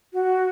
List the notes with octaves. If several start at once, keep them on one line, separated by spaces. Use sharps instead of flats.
F#4